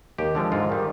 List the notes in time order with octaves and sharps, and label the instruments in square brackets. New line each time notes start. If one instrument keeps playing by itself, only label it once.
[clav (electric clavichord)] D#2 G4
D3 F3 G#3
G#2 F4
D#3 G3